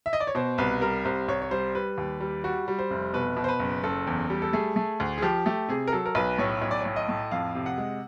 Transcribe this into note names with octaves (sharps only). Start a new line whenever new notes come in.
E5
D#5
D5
C#5
B2 C5
C2 B4
G3 A#4
C2 C5
C2 C#5
C#5
G3 C5
G3 B4
D#2
G3
G3 F#4
G3
C5
F1
B2 B4
B2
C5
B4
F#1
F#1 A4
E2
G3
A4
A3 G#4
A3
D2
G#4
F3 G4
A3 G4
C3 G#4
A#4
F#3 A4
A#4
B1 B4
A2 C#5
B1 C#5
D5
C#5
A2
D#5
A2
F2 F5
C3
F#5
G#3